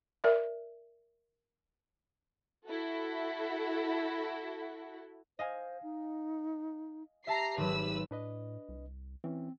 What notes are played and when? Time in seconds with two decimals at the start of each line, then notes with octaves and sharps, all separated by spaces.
0.24 A#4 D5 E5
2.67 E4 F#4 A4
5.39 C5 D#5 F5 G#5
5.83 D#4
7.27 G4 E5 A5 A#5 C7
7.57 G#1 F#3 B4 E6
8.11 A2 D4 B4 D#5
8.69 C2
9.24 E3 C4 C#4